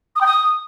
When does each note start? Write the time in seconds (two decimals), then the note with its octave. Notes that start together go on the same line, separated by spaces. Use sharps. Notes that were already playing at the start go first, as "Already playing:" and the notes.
0.16 D#6
0.21 G5
0.26 D#6